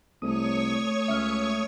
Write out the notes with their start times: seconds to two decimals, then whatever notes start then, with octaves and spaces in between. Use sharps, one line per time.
0.22 C2 A3 C#5 C#6 D#6
1.08 C#2 E5 F6